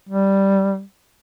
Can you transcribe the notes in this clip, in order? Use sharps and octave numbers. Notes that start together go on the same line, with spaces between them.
G3